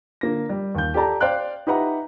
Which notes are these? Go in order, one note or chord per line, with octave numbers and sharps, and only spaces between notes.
D3 A#3 A#6
G3
D#2 G6
G4 A4 D5 A5 A#5
C5 D5 F5 G5 F#6
D#4 G4 B4 E5 F#5 A#5